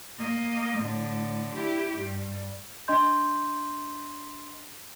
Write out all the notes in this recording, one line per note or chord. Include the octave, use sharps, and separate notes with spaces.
A#3 D#5
A2 D3
E4 G4
G2
D4 D#5 C6 G6